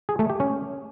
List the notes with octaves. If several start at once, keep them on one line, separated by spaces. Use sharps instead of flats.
G#4
A3
G4
C#4